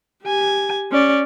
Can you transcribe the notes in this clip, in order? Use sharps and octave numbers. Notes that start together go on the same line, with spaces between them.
G4 G#5
C#4 D5